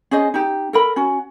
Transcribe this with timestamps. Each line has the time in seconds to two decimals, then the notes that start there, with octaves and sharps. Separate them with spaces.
0.11 C#4 G#4 C5 D#5
0.34 D#4 G4
0.73 A4 A#4 B5
0.96 C#4 F#4